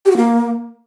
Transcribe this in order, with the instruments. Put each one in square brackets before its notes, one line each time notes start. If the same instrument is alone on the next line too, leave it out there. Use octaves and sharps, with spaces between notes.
[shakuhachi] G4
F#4
A#3